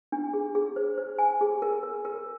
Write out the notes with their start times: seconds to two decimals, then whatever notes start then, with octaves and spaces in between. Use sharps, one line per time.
0.12 D4
0.33 G#4
0.55 G#4
0.76 C5
0.98 C5
1.19 G#5
1.41 G#4
1.62 A#4
1.83 A#4
2.05 A#4